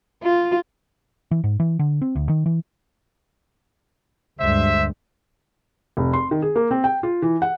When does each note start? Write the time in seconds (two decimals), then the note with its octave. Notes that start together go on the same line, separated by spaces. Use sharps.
0.23 F4
1.31 E3
1.44 G#2
1.60 E3
1.79 D3
2.02 C4
2.15 D2
2.29 D#3
2.46 E3
4.39 D2 G2 G#3 C5 E5
5.97 F1
6.13 C6
6.31 D#3
6.42 G#4
6.56 A#3
6.71 C4
6.84 G5
7.03 F4
7.22 E3
7.42 F#5